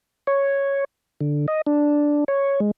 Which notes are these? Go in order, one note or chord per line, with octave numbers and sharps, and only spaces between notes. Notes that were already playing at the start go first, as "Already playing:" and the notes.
C#5
D3
D#5
D4
C#5
G#3